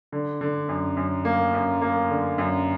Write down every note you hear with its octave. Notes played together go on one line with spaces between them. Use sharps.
D3
D3
F#2
F#2
A#3
F#2
A#3
D3
F#2